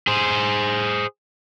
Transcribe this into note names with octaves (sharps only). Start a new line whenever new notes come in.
G#4 C5